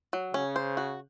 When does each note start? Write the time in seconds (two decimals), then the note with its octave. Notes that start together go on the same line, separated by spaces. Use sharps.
0.13 F#3
0.34 C#3 C#4
0.56 C5
0.77 F#4